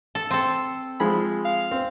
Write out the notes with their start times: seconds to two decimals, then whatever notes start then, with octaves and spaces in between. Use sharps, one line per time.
0.15 A4
0.31 C4 A4
1.00 F3 G#3 B5
1.45 F5
1.71 C4